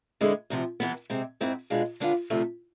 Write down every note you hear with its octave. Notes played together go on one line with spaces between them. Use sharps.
E2 D3 G#3 C4 E4
D2 C3 F3
C3 E3 B3
C3 G#3 C4
G#2 G#3 C4 E4
B2 G#3 D4 F4
D3 G#3 B3 D4 F4
D2 C3 F3 A3